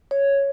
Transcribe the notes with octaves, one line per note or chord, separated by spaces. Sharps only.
C#5